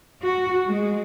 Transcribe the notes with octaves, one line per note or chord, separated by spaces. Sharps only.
F#4
G#3